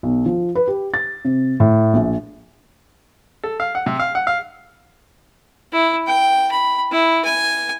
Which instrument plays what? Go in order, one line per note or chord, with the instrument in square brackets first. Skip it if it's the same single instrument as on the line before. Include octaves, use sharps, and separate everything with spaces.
[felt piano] B1
F3
B4
G4
A6
C3
A2
A#1
[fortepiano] A4
F5
F#5
C3
F5
F#5
F5
[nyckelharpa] E4
G5
B5
E4
G#5